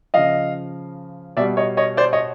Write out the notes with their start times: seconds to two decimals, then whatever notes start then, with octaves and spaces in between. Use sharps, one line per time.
0.14 C#3 F3 D#5 F5
1.37 B2 G3 D5 E5
1.57 C#5 D#5
1.77 C#5 D#5
1.97 C5 D5
2.13 C#5 D#5